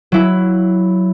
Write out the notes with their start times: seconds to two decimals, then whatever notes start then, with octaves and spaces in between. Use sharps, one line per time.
0.12 F#3 E4